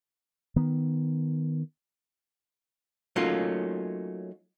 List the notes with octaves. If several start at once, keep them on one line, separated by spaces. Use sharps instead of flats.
D#3 B3
F#3 A3 A#3 C#4 D#4 F4